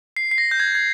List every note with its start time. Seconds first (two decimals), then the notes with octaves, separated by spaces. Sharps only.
0.17 C7
0.31 C7
0.38 A#6
0.51 G6
0.60 G#6
0.75 G#6